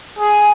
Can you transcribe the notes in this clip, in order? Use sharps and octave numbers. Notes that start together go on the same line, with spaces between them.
G#4